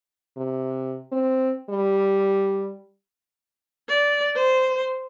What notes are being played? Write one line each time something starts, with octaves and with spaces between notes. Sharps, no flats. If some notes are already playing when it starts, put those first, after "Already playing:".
C3
C4
G3
D5
C5